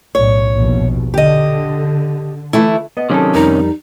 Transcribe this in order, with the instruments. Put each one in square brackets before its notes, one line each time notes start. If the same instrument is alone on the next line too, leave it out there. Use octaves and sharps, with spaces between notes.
[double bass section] B1 A2 [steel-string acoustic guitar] C#5
[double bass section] A#1 D#2 B2
[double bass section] D3 [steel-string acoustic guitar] G4 D#5
[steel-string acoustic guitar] E3 A3 E4
[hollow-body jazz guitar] B3 D#5
[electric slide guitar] C3 D#3 C#4 [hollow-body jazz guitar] F#3 A4
[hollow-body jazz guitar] F2 G3 A#4 [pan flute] D#4